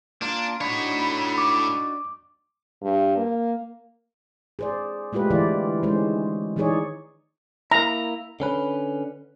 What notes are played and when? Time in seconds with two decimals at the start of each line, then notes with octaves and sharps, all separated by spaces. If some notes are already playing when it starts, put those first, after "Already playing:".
0.22 A#3 D4 F4 A#4
0.61 A2 D4 D#4 F#4 C#5 B5
1.38 D6
2.82 G2
3.17 A#3
4.59 G#4 C5 D5
5.13 G#3 A3 F4 G4 B4
5.30 D3 E3 E4 F4 C5 D5
5.83 D#3 G#3 C#4 C5
6.56 D#3 E3 D#4 G#4 C#5 D5
7.72 A#3 E4 A#5
8.40 D3 C#4 B4